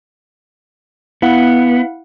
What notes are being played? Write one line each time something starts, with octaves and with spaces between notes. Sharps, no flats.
B3 E4 F5 F#5